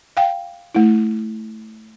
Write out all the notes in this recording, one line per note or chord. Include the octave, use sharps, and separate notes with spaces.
F5 G5
A3 E4